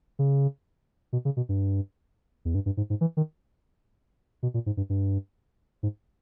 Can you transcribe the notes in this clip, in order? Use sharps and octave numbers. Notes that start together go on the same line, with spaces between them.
C#3
B2
C#3
B2
G2
E2
G2
G2
G#2
G#2
E3
D#3
B2
A#2
G#2
G2
G2
G#2